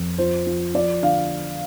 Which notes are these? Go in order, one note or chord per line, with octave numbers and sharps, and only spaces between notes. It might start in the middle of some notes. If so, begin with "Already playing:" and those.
Already playing: F2
F3 C5
F3
F3 D5
D3 F5